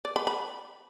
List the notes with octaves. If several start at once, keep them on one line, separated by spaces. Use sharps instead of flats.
D5
B5
B5